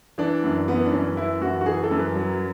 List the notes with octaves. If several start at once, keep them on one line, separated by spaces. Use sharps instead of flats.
E3 D4
F#2
E3 B3
D4
F#2 C#4
E3 E4
F#2 F#4
F#4
E3 G#4
A4
F#2
B4
F#3